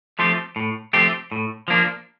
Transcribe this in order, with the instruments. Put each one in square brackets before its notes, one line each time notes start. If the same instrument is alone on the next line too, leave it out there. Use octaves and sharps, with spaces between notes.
[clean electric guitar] F3 A3 C4 G4
A2
F3 A3 C4 G4
A2
F3 A#3 D4